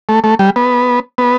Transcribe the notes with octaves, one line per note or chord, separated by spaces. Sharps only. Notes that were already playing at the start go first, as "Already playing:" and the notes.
A3
A3
G3
B3
B3